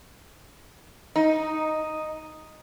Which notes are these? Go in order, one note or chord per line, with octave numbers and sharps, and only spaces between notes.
D#4